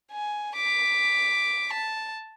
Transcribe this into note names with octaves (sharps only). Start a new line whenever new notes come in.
G#5
D6 B6
A5